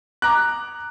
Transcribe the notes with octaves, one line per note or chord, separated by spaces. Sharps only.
A#5 D6 F#6